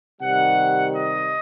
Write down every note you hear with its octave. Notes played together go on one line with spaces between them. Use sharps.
C3 D#3 G3 F#5
D#5